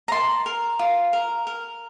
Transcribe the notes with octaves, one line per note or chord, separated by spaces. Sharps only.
A#5
A#4 A5 C6
A#4
F4
A#4
A#4